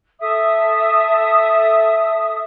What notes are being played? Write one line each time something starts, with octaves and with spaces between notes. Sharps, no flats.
A4 E5 D#6